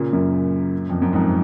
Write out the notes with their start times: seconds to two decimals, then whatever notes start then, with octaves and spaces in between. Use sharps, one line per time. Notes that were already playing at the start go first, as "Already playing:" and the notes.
Already playing: A#2 C#3
0.13 F#2 A#2
0.89 F2
1.02 F#2
1.13 F2 G#2